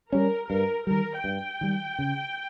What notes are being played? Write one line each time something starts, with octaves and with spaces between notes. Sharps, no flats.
G3 C#4 A#4
G2 A#4
D#3 G3 A#4
G2 G5
D#3 G3
C#3